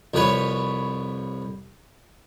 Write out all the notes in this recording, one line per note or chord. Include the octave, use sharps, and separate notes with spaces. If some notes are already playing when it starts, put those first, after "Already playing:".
C2 F2 B4 C#5